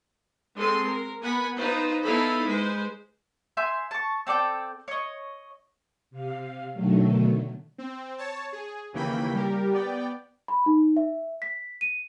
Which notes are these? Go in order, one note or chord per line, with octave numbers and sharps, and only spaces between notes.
G#3 C4 A4 C6
A#4
B3 A#4 F#5 G#5 B5
D#4 F4 B4 C5
B3 D#4 E4 A4 F5 B5
G#3 B4 C5
E5 G#5 C6 G6
A5 C#6
C4 A4 D5 G5
C#5 D#5
C3 F5
B2 D3 D#3 F#3 A3
C4
C#5 A5
G#4
D#2 C#3 E3 A#3 G5 B5
G3 G4 A#4
B3 D5 G5
B5
D#4
E5
B6
D#7